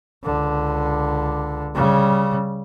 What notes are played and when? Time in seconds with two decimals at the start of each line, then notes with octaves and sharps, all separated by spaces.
0.24 C#2 D3
1.75 C#3 G3